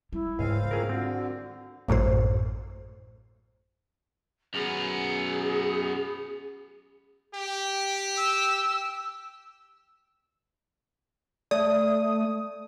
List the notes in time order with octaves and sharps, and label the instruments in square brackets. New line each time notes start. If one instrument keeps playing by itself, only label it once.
[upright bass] G3 [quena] E4
[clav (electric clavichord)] C#2 G#5 [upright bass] G#2 D#3 [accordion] C4 F5
[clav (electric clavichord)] C#4 G#4 A#4 [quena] F4
[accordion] D3 [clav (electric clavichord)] C4 [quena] F#4
[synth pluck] A1 F#2 A2 C5
[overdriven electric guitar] F#2 B3 [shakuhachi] G#4
[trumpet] G4
[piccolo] E6
[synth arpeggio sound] A3 D#6 [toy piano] D5